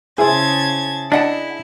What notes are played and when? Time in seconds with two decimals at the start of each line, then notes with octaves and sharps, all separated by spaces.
0.18 C#3 E4 G#4 C5 E5 A5 G#6
1.12 D4 E4 D#5 F#5 A5